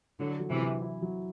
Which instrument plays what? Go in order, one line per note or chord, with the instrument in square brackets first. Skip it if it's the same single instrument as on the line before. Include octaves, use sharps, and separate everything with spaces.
[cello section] D3 F#3 [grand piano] E4
[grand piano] F#3
[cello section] C3 E3
[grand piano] F#3
E4
F#3